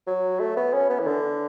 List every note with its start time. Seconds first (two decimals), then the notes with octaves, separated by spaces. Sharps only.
0.07 F#3
0.40 A3
0.57 B3
0.73 C#4
0.90 B3
0.99 E3
1.07 D3